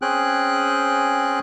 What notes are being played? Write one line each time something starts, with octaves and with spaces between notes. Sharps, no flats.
C4 C#4 G#4 G5 F#6